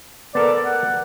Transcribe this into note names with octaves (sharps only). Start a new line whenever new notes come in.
B3 A4 A#4 D5
F#5